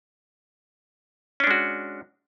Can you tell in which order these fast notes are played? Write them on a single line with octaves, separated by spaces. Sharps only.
C#4 D4 G#3 F#4